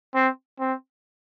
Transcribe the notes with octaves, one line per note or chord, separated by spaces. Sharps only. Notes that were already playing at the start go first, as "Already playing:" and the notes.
C4
C4